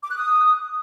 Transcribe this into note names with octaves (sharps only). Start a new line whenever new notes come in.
D6
F#6
D#6